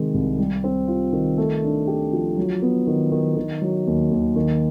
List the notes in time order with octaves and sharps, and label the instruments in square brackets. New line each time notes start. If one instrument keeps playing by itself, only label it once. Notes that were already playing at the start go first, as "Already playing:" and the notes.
Already playing: [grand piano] C3 D#3 G#3
C2
G3
C4
F4
D#3
A3
D4
G4
F3
F#3
B3
D#3
D#3
D#3
F#3
D#2
D#2
D#3